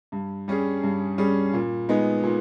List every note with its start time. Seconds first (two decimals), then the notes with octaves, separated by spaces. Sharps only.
0.12 G2
0.48 G3 C#4 G#4
0.83 G2
1.18 G3 C#4 G#4
1.54 A#2
1.89 G#3 B3 D#4
2.23 A#2